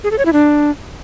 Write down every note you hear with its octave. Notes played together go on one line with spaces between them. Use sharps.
G#4
A4
C#5
E4
D4